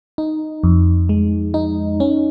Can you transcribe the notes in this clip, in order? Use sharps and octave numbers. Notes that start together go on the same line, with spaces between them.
D#4
F2
G#3
D#4
C#4